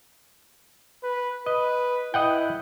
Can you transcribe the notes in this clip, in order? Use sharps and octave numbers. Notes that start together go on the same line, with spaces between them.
B4
B4 D#5
E4 D#5 F#5 G5